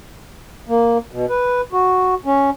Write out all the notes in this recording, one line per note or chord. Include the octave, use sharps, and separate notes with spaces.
A#3
B2
B4
F#4
C#4